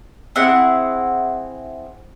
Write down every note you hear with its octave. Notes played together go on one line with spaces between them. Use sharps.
C4 E4 G#4 F#5